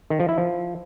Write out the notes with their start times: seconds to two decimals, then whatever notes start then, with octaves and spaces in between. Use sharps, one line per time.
0.10 D#3
0.20 F3
0.29 E4
0.38 F3